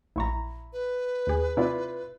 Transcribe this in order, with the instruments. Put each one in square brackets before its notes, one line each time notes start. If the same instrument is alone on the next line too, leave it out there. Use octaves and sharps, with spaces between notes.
[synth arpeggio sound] A#1 A#5 [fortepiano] E4 C#6
[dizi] B4
[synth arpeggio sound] D#2 G#4
[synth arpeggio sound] C3 [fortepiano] E4 F4 D5